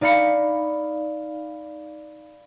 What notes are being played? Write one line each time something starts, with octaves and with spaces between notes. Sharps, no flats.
D#4 D5 F5 B5 C#7